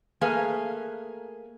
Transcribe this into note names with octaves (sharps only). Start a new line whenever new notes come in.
A3 A#3 G#4 B4 F5 G#5